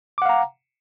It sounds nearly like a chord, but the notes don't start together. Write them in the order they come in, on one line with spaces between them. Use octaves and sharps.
D6 F#5 F5 A#5